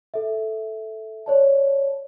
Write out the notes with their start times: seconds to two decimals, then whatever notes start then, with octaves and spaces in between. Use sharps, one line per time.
0.14 A4 E5
1.26 C#5 D5 A5